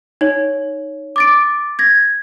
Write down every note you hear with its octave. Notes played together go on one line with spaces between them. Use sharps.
D#4 C#5
D6 A6 D7
G#6 A#6